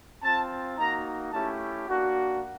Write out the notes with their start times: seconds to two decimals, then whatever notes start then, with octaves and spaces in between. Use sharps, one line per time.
0.23 C4 F4 A5
0.78 A#3 D#4 F#4 A#5
1.33 A3 C#4 E4 G4 A5
1.88 A#3 D4 F#4